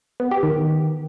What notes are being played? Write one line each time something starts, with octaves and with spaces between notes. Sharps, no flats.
B3
G4
D#3